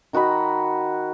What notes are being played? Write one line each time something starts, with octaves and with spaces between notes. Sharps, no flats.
D#3 F#4 D#5 B5